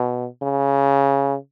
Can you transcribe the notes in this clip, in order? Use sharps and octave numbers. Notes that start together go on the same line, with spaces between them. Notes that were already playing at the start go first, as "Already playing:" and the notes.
Already playing: B2
C#3